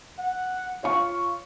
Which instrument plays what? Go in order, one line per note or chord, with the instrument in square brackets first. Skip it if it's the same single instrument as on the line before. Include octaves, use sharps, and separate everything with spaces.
[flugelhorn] F#5
[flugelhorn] F4 [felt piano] C#5 F5 C#6